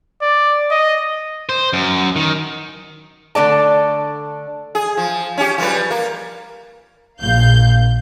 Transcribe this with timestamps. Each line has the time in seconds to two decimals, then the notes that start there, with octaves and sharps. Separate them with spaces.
0.22 D5
0.71 D#5
1.49 C5
1.73 F#2
2.16 D#3
3.35 D3 A3 D5 A5
4.75 G#4
4.97 F3
5.38 C#4 G4
5.58 F3 G3 B4
5.91 A#3
7.20 A#1 F5 G6